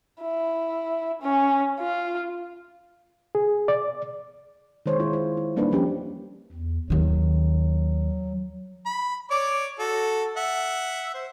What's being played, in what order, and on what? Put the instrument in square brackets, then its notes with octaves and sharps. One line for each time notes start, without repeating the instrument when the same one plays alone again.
[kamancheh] E4
C#4
F4
[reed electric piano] G#4
D5
[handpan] D#3 G#3 C5 C#5
E4 F4
C5
E4
G3 A#3 D4 D#4 B4
F3 C#4 G4
[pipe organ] E2
[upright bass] D#2 D#3 [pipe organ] F#3
[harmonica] B5
C#5 D5 D6
F#4 A4
E5 F#5
C5